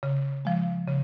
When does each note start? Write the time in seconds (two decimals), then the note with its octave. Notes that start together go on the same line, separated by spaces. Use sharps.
0.03 C#3
0.45 F3 G#3
0.88 C#3